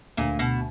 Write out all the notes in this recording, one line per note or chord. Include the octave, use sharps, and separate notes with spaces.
D2 A#2
B2